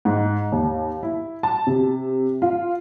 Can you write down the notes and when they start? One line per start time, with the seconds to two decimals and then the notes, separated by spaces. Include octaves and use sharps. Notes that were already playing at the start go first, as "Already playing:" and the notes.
0.05 G#2
0.52 D#2
1.03 E4
1.43 A5
1.67 C3
2.42 F4